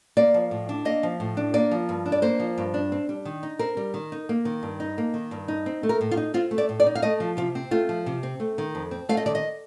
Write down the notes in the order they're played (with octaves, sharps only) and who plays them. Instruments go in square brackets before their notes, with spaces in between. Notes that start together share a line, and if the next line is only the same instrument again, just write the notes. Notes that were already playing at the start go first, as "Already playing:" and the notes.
[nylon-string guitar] A#3 D5
F3
A2
D4
A#3 D#5
F3
A2
D4
A#3 D5
F3
G2
D4
D5
A#3 C5
F3
G2
D4
C4
G3
D#3
D#4
C4 A#4
G3
D#3
D#4
A#3
D#3
G2
D#4
A#3
D#3
G2
D#4
C4
A3
A#4
A2
F4
D#4
C4 F4
A3
D5
A2
D5
D#4
F5
A3 D#5
F3
C3 F4
C4
A3 F4
F3
C3
C4
A3
D#3
F2
C4
A3 F5
D#5
D#3 D5
D#5